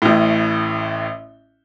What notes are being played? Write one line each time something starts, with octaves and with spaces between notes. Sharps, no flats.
A1 A2